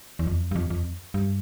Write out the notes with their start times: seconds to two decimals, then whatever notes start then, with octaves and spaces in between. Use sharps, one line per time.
0.19 E2
0.27 F2
0.51 G2
0.55 F2
0.70 F2
1.14 G2